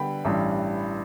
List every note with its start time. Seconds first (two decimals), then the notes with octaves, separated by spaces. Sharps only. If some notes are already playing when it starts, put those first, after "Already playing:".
Already playing: D3 G3 B3 G5 B5
0.25 A1 G2 E3 G3